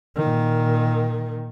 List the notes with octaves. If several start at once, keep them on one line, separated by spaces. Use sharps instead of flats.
A#2 D#3